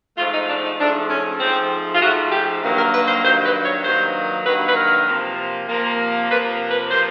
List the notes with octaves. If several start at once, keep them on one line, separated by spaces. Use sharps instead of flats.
G#2 F3 A3 F4
D#4
D4
D#4
G#2 F3 A3 D4
C#4
G#2 F3 A3 C4
F4
G#2 F3 A3 F#4
G4
G2 D#3 F#3 A#3
A#4
B4
C5
G2 D#3 F#3 A#3 C5
B4
C#5
G2 D#3 F#3 A#3 C5
G2 D#3 F#3 A#3 B4
B4
A#4
C3 F3 A#3
C3 F3 A#3
C3 F3 A#3 B4
B4
C3 F3 A#3 C5